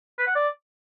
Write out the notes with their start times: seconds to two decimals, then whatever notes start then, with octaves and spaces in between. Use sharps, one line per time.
0.18 B4
0.27 F#5
0.35 D5